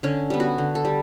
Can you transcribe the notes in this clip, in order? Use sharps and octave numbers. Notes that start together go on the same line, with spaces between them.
D3 C#4
G3 B3
F#4
D3
A4
G3